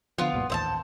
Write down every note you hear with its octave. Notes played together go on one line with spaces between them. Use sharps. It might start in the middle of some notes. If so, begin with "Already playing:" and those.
D3 F3 B3 F4
C2 G2 A#2
A1 D#2 C5 E5 A5